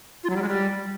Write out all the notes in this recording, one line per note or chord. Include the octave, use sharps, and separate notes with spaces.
F4
F#3
G3
G#3
G3